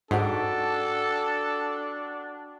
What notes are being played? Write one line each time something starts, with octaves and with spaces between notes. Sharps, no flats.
G#2 D4 F#4 A4 G5